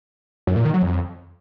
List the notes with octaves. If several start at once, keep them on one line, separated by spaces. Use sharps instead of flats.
F#2
A#2
D#3
F#3
F2